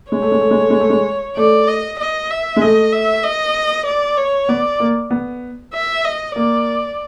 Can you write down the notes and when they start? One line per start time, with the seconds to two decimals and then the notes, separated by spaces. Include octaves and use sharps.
0.12 G#3 C#5
0.22 A3
0.32 G#3
0.41 A3
0.51 G#3
0.60 A3
0.70 G#3
0.80 A3
0.90 G#3
1.37 A3 D5
1.68 D#5
1.99 D#5
2.30 E5
2.56 G#3
2.62 A3 D#5
2.92 E5
3.24 D#5
3.86 D5
4.17 C#5
4.49 B3 D5
4.80 A#3
5.11 B3
5.74 E5
6.05 D#5
6.36 A#3 D5